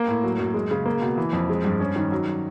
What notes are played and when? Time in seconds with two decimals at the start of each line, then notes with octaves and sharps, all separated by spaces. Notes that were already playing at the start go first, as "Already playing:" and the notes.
Already playing: A#3
0.08 A2
0.24 F#3
0.39 F#2
0.54 G#3
0.71 C#3
0.86 A#3
1.01 B2
1.18 E3
1.33 F2
1.49 G#3
1.65 G2
1.80 C#4
1.96 D#3
2.12 F#3